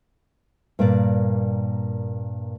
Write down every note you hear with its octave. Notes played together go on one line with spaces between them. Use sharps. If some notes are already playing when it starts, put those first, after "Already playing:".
G2 A#2 A#3 D5